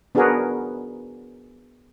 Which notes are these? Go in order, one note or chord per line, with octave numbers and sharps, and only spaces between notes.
B3 D4 F#4 G#4 A#4 B4